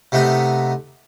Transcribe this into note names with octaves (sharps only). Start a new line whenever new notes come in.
C3 A3 B3 D#4